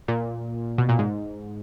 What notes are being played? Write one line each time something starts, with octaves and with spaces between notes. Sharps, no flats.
A#2
B2
A#2
G#2